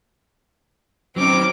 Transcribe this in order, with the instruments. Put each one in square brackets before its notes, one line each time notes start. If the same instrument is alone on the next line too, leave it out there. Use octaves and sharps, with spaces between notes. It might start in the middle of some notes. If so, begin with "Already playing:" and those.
[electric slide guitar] F#3 C#4 D#4 [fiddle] C4 D6